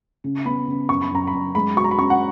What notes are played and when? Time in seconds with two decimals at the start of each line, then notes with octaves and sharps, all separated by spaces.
0.24 C#3
0.45 B3 B5
0.67 C#3
0.89 F#2 C#6
1.02 B5
1.11 F#2 A#5
1.27 B5
1.33 F#2
1.55 G#3 B5
1.76 F#4 C#6
1.84 A#5
1.91 B5
1.98 C#4 C#6
2.10 F#5